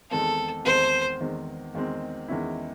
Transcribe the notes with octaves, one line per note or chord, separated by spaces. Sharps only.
E2 D#3 G#3 C4 A4
E2 D#3 G#3 C4 C5
E2 D#3 G#3 C4
E2 D#3 G#3 C4
E2 D#3 G#3 C#4 E4